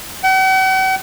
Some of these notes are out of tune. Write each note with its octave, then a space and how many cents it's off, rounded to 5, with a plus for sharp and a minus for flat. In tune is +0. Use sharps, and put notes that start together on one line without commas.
F#5 +45